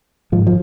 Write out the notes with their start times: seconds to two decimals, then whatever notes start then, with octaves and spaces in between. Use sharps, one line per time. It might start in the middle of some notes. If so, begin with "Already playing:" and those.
0.32 G#2 F3
0.47 F3